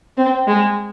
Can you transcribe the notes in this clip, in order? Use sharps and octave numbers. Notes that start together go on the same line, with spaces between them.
C4
G#3